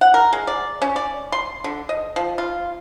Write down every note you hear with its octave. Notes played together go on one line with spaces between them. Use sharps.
F#5
A#4
G#3
D5
C#4
D5
C6
D3
D#5
F3
F4